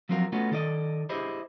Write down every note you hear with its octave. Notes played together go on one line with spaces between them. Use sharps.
F3 F#3 C4 F4 F#4 A#4
A3 B3 C#4 D#4 F4 F#4
D#3 A4 D5 D#5
E4 G4 G#4 C5 D#5